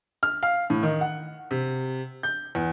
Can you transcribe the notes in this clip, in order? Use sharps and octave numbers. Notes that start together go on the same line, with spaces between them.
F6
F5
A2
D#3
F#5
C3
G6
E2